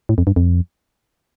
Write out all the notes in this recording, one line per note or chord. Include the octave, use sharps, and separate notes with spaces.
A2
F2
G2
F2